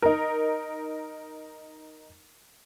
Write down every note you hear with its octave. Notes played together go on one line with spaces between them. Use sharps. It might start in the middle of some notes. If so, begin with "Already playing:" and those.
D#4 A#4